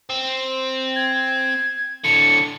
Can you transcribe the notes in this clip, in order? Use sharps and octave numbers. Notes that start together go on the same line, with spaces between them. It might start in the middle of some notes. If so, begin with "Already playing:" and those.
C4
G#6
A2 D3 C#7